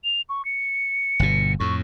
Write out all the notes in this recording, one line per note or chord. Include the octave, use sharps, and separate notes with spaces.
F7
C#6
C#7
G1 B2
F2 A2 C#6